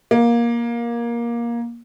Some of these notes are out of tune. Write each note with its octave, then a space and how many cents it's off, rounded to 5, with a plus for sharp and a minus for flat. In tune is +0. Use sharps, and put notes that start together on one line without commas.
A#3 +15